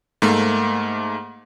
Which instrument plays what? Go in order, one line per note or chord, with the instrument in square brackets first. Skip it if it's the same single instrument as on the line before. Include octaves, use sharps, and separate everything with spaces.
[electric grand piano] G#2 A3 A#3